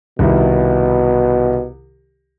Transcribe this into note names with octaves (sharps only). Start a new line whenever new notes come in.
C2 B2 D#3 E4